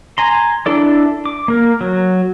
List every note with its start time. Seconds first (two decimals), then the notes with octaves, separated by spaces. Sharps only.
0.18 G#5 A#5 C6
0.66 D4 E4 A4 D5
1.25 D6
1.48 A#3 A#4
1.81 F#3